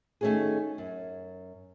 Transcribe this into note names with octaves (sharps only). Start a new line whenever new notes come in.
D#3 A3 B3 C#4 F#4 G#4
F#2